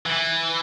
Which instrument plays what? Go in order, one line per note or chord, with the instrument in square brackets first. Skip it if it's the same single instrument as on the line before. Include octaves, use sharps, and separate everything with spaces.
[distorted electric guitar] E3